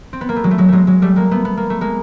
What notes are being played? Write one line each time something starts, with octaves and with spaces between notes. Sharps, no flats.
C4
B3
A#3
A3
F#3 G#3
A3
F#3 G#3
F#3 G#3 A3
F#3 G#3
G3 A3
G#3 A#3
A3 B3
B3
A#3
A3
G#3 A#3